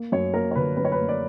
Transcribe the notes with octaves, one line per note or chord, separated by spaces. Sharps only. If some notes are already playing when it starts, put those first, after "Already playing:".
Already playing: A#3
F#2 C#5
A#3 A#4
C#5
D3 B4
F#2 B4
C#5
B4
A#3
D5